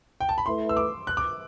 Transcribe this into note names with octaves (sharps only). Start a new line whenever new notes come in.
G5
A5
B5
A3 E4 B4 C6
E6
D6
F#6
D6